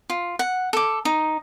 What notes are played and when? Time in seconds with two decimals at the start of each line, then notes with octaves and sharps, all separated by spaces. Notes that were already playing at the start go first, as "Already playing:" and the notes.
0.10 F4
0.39 F#5
0.73 A4 D6
1.05 D#4